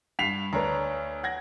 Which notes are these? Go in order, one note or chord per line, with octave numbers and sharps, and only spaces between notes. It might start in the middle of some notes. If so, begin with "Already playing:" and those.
G2 B6 C7 F7
D2 D4 B4 C#5 A#5
F#5 G#6 A#6